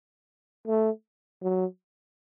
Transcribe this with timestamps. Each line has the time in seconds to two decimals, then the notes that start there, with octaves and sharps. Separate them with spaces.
0.68 A3
1.43 F#3